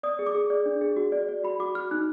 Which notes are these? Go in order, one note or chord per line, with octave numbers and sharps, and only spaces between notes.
D5 D#6
G#4
D6
G#4
D5
D4
G#4
F#4
D5
D5
F#4 B5
F#4 D6
F#4 F6
D#4 F#6